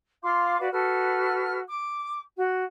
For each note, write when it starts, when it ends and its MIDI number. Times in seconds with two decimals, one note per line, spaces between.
0.23 0.57 65
0.23 0.57 77
0.23 0.57 84
0.23 0.57 86
0.59 0.67 66
0.59 0.67 71
0.59 0.67 74
0.59 0.67 77
0.72 1.59 66
0.72 1.59 69
0.72 1.59 71
0.72 1.59 89
1.69 2.20 86
2.37 2.64 66